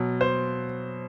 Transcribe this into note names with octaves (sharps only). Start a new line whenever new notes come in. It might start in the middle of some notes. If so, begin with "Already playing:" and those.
Already playing: B2 F#3
C5